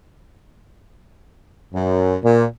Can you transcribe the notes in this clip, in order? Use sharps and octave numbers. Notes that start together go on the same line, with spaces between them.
F#2
A#2